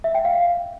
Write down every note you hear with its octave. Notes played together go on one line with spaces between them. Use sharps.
E5
G5
F5